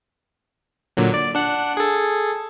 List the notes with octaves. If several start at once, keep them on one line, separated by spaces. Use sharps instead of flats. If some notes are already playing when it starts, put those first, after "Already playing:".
A#2 D3 F#3
D5
D4 F#5
G#4 A4